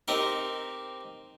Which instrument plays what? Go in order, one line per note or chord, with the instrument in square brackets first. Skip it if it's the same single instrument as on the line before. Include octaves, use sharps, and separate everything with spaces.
[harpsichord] C4 D#4 G4 A#4